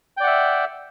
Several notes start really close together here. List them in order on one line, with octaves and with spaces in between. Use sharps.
G5 D5 F#5 E5